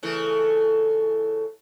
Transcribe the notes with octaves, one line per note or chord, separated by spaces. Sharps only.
C#3 E3 A3